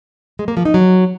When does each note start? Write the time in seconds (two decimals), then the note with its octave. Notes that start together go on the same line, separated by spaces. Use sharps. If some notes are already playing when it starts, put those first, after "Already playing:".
0.39 G#3
0.48 A#3
0.57 F3
0.65 D#4
0.74 F#3